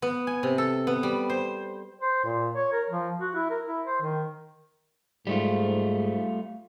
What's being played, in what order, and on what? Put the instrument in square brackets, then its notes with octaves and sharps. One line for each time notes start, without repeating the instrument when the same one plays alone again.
[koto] B3
G#5
C3
A4
B3
G3
C5
[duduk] C5
A#2
C#5
A#4
F3
F#4
E4
A#4
E4
C5
D#3
[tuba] G#2 [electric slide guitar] G3 A3 F4